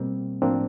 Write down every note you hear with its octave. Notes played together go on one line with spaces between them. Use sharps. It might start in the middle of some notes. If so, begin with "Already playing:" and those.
Already playing: B2 G3 A#3 C4
A2 F3 A#3 C4 D4